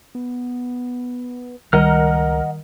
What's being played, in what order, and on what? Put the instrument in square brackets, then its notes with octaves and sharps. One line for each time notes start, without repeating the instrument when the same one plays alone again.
[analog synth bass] B3
[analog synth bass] C#2 [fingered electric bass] D#3 G3 [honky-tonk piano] A#4 [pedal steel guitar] D#5 F#5 F6